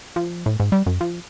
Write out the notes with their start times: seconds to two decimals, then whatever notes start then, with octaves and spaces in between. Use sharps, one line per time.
0.16 F3
0.46 A2
0.60 G#2
0.72 G3
0.86 F#2
1.01 F3